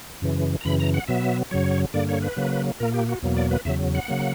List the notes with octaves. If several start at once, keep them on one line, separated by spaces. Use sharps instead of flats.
F#2 C#3 E3
A#5
F#2 C#3 E3 B5
A#5
F#5
B2 F#3 B3 E5
F#2 C#3 F#3 C#5
G2 D3 A#3 D5
C#5
B4
C#3 F#3 A#3
A#2 A#3 A#4
G4
F#4
E2 B2 F#3 A#3
D5
B4
E2 C#3 F#3 E5
F#5
C#3 F#3 A#3